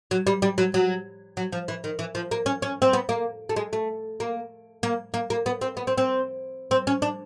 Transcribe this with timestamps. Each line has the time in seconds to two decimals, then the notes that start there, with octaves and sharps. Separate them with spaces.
0.11 F#3
0.27 G3
0.42 G3
0.58 F#3
0.74 F#3
1.37 F#3
1.52 F3
1.68 E3
1.84 D#3
1.99 E3
2.15 F3
2.31 A#3
2.46 C#4
2.62 C#4
2.82 C4
2.93 B3
3.09 A#3
3.49 A3
3.56 G#3
3.73 A3
4.20 A#3
4.83 A#3
5.14 A#3
5.30 A#3
5.46 B3
5.61 C4
5.77 B3
5.87 C4
5.98 C4
6.71 C4
6.87 C#4
7.02 D4